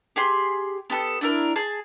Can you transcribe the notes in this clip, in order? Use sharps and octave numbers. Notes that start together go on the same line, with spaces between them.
G4 G#4 C6
B3 G4 A4
D4 E4 A#4
G#4 A5